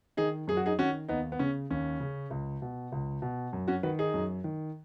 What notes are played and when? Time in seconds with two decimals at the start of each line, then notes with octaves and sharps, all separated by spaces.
0.17 D#3 D#4 G#4
0.48 F#2 G#4
0.57 F#4
0.66 D#4 G#4
0.79 D#3 C#4 F#4
1.08 D#2 B3 D#4
1.32 B3
1.39 C#3 C#4
1.70 D#2 C#4
2.00 C#3
2.30 C#2
2.62 B2
2.92 C#2
3.22 B2
3.53 F#2
3.68 C#4 F#4
3.83 D#3 F#4 B4
3.99 D#4 G#4
4.14 F#2
4.44 D#3